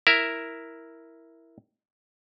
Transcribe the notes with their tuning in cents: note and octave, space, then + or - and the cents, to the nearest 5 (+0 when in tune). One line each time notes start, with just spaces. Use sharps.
E4 +0 A#4 +0 E5 +0